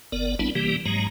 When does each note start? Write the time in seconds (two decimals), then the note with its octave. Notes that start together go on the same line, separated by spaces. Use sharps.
0.12 G1 B3 A#4 D5
0.39 A1 G3 B3 C4 D4 E4
0.55 C3 E3 G3 A#3 G4
0.86 G#2 F#3 G#3 A#5